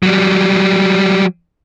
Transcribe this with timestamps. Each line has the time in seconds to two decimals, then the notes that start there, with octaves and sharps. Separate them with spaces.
0.03 F#3 G3